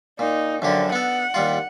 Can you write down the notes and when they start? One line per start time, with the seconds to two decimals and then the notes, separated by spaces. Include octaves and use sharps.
0.19 A#2 D#4
0.62 F#2 D3 F3 G4
0.92 B3 A4 F#5
1.34 D#2 G3 F4